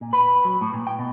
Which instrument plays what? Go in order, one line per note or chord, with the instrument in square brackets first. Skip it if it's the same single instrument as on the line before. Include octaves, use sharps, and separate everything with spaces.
[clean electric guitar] A#2
B4
F#3
A2
A#2
G5
B2